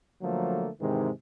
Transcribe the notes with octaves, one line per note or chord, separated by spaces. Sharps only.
D3 F3 F#3 A3 A#3
G#2 C3 D#3 E3 G#3